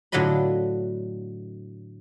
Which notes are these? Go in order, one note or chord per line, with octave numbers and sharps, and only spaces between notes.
A2 D3 F#3 F4 D#5 B5